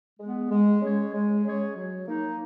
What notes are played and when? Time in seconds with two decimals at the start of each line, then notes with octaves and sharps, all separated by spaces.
0.20 G#3 B3
0.51 G#3
0.82 C#4 G#4 C#5
1.14 G#3
1.45 C#4 G#4 C#5
1.76 F#3
2.07 A#3 D#4